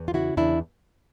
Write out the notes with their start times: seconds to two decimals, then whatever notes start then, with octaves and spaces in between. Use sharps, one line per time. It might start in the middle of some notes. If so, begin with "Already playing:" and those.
Already playing: E2
0.08 F4
0.14 C#3 E4 F#4
0.37 E2 D4 E4